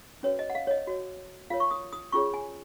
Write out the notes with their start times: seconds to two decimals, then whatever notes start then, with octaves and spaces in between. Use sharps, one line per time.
0.23 C#4 F#4 B4 C#5
0.39 D#5
0.50 F#5
0.55 F5
0.67 C#5
0.71 D#5
0.87 F#4 C#5
1.50 F4 A#4 C#5 F5
1.60 C#6
1.71 D#6
1.93 D#6
2.12 C#4 F4 G#4 C#5 C#6
2.34 G#5